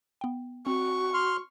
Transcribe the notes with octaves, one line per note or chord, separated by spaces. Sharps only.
B3 G5
C4 F#4 C#6
C6 F6